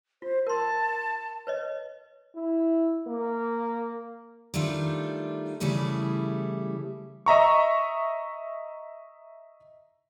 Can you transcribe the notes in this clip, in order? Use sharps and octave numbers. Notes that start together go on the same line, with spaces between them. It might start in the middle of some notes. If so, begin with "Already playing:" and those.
F4 C5
A#4 A5 C6
B4 C#5 D#5
E4
A#3
D#3 G3 A3 D4 F4
C#3 E3 G3 A3 E4 G#4
D#5 E5 A#5 C#6